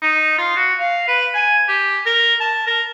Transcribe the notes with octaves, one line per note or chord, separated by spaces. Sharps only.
D#4
F4
F#4
F5
B4
G#5
G4
A#4
A5
A#4